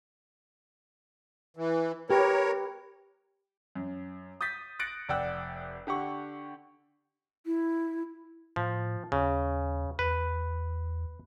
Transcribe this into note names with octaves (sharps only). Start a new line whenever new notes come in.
E3
G4 A#4 B4 C#5
F#2
D#6 G6 A6 B6
F#6 A6 A#6 C#7 D7 F#7
F1 D5 F#5 G5 E6 F#6
D3 G4 F#5 C#6
E4
A2 F3
D#2 C#3
E2 B4